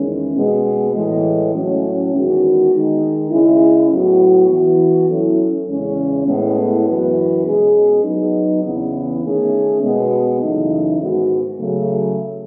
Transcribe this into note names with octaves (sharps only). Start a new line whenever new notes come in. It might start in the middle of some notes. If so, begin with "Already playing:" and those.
Already playing: E2 D#3 G#3 C#4
B2 G#3 B3
A2 E3 G#3
A2 F#3 A3 C#4
E2 D#3 G#3 B3 F#4
D#3 G#3 D#4
C#3 G#3 C#4 E4
A2 F#3 B3 F#4
E3 B3 F#4
F#3 C#4 E4 A4
E2 C#3 G#3 C#4
A2 G#3 B3
F#2 E3 B3 F#4 B4
B2 G#3 C#4 G#4
F#3 B3 D#4
E2 C#3 E3 B3
D#3 A3 C#4 G#4
B2 G#3 B3
F#2 C#3 E3 A3 D#4
G#2 D#3 G#3 B3 F#4
C#3 F#3 A3